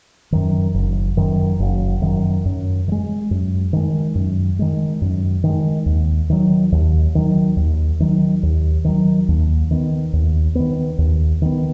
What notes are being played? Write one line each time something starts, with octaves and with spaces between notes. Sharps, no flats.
F#2 D#3
F#1
F#2 D#3
F#1
F#2 D#3
F#2
D#3
G#3
F#2
D#3 G#3
F#2
D#3 G#3
F#2
D#3 G#3
D#2
D#3 F#3
D#2
D#3 F#3
D#2
D#3 F#3
D#2
D#3 F#3
D#2
D#3 B3
D#2
D#3 B3
D#2
D#3 B3